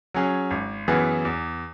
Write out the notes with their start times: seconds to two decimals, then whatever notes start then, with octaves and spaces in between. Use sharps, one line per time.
0.14 F#3 C#4 G#4
0.51 G#1
0.88 F#2 E3 B3 G#4
1.25 E2